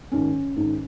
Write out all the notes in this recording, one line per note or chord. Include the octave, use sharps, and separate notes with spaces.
G#2 D#3 C#4
G#2 D#3